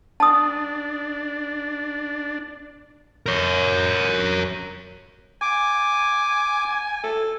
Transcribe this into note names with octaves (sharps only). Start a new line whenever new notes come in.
D4 A5 D#6
A#4 C#5
G#5 D6
A4